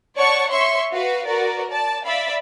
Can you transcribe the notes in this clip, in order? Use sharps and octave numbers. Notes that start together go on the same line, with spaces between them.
C#5 D5 F#5 A5 C#6
C#5 E5 C6 C#6
F#4 B4 F5
F#4 A#4 B4 D5
D5 A5
D5 E5 F5 B5